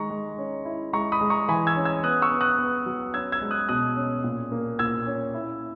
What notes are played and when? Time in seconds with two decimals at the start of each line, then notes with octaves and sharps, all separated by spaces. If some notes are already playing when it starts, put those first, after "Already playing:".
Already playing: D#3 G#3 A#5 C#6
0.10 G#3
0.38 C#4
0.65 E4
0.93 G#3 A#5 C#6
1.12 B5 D#6
1.21 G#3
1.30 A#5 C#6
1.48 E3 G#5 B5
1.67 E6 G#6
1.76 C#4
1.85 E6 G#6
2.03 B3 D#6 F#6
2.22 C#6 E6
2.31 B3
2.41 D#6 F#6
2.58 B3
2.86 F#3
3.14 C#4 E6 G#6
3.32 E6 G#6
3.41 G#3
3.51 D#6 F#6
3.69 B2 D#6 F#6
3.96 C#4
4.24 A#2
4.52 A#3
4.79 A#2 E6 G#6
5.07 C#4
5.34 E4